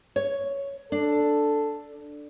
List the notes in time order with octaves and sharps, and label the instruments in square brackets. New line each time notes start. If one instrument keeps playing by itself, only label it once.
[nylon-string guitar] C#5
[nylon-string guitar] D4 [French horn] A4